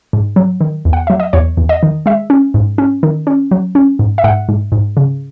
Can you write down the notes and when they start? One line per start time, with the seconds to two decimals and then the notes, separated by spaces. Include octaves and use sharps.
0.13 G#2
0.36 F#3
0.61 D#3
0.85 E2
0.93 F#5
1.07 F#3 E5
1.20 D#5
1.33 E2 C#5
1.57 E2
1.69 D#5
1.83 D#3
2.06 G#3 E5
2.30 C#4
2.54 G#2
2.78 C#4
3.03 D#3
3.27 C#4
3.51 F#3
3.75 C#4
3.99 G#2
4.18 E5
4.24 G#2 F#5
4.49 G#2
4.72 G#2
4.97 C#3